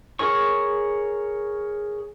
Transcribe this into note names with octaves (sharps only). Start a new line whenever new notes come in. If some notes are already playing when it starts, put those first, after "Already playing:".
G#4 A#4 C#5 C#6